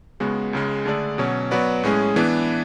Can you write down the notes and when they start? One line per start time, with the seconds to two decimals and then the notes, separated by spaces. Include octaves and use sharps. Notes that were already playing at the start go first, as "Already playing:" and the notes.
0.20 C#2 C#3 G#3 B3 F#4
0.53 C#2 C#3 G#3
0.86 D3 A3 D4 G#4 D5
1.18 B2 F#3 C#4
1.51 F#3 B3 F#4 B4 D5
1.83 A2 G#3 C#4 G#4
2.16 E3 B3 D4